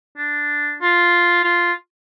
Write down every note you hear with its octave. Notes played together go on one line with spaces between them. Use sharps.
D4
F4
F4